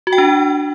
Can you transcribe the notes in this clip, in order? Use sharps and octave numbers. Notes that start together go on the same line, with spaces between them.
F#4
G5
D4